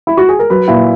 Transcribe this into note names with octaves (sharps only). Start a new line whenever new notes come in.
E4
F#4
G#4
A#4
F#3 B4
A#2 E4